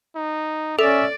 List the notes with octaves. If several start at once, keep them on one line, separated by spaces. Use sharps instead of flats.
D#4
C#4 A4 D5 E5